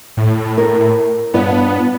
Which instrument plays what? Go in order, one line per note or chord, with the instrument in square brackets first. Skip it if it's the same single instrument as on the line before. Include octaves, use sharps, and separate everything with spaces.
[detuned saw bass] A2
[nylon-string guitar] A#4
[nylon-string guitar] G2 F4 C#5 [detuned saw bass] B3